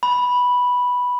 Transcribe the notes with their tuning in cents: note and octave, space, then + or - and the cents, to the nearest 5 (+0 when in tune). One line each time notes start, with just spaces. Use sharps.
B5 -5